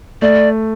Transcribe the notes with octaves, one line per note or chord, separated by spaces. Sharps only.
A3 D5